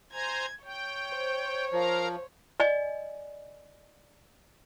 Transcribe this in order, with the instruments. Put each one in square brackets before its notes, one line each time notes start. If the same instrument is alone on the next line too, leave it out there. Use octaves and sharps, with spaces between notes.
[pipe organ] C5 G#5 A#5 [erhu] G#6
[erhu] C#5 [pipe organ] G5
[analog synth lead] C5
[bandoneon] F3 [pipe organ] A#4 F5 A#5
[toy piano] D5 D#5 G#5